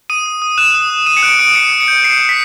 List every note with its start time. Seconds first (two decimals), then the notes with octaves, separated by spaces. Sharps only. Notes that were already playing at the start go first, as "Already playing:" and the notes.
0.10 D#6 D#7
0.26 D#6
0.42 D#6
0.58 F#6 E7
0.74 D#6
0.90 D#6
1.06 D#6 D#7
1.17 C#7
1.23 F#6 D7
1.39 D#6 D7
1.56 D#6 C#7
1.72 D#6
1.80 C#7
1.88 G6
2.04 D#6 C7
2.21 D#6
2.29 B6